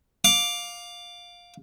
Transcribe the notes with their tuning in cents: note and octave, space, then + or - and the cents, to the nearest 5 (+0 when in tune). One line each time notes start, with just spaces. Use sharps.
F5 +15 D6 +0